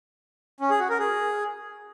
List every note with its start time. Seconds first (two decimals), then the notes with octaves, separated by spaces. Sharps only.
0.60 C#4
0.70 G#4
0.80 F#4
0.90 A#4
0.99 G#4